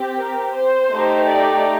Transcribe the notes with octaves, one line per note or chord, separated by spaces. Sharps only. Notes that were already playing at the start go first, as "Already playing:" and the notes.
Already playing: C4 G4
A#4
C5
A3 D#4 G4
D5